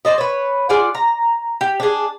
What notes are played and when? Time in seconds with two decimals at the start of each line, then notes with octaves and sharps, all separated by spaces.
0.05 C4 C5 D5 D#5
0.18 B4 C#5
0.69 F4 G#4 D5 F#5
0.95 A#5
1.61 G4
1.80 D4 G#4